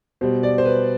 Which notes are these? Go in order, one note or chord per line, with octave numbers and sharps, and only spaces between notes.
B2 G3 C5
D5
C5
B4